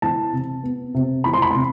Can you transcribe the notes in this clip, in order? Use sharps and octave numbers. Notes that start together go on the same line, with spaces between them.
E3 A5
C3
B3
C3
E3 B5
C6
B5
C6
C3